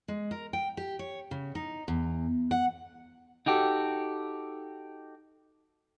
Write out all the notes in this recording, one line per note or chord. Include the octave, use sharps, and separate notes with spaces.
G#3
A#4
G5
G4
C#5
C#3
D#4
E2
F#5
D#4 F#4 G4 A4